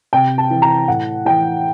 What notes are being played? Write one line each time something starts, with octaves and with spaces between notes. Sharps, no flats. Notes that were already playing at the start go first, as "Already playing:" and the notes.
C3 G5
A5
E3
A#5
A2 F#5
E3 G5